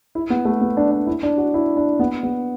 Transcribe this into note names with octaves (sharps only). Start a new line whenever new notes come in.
E4
B3
A3
B3
D4
D4
E4
D4
F#4
E4
D4
B3
B3